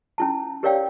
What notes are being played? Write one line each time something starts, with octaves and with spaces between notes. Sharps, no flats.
C#4 E4 A5
G4 A#4 C#5 D5 F5 G5